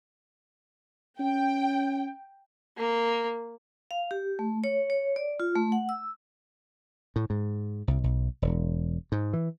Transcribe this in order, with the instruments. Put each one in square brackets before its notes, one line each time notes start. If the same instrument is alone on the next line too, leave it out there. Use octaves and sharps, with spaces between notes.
[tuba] C#4 [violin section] G5
[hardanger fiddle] A#3
[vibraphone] F5
G4
A3
C#5
C#5
D5
F4
A3
F#5
E6
[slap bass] A2
G#2
C2
B1
E1
G#2
E3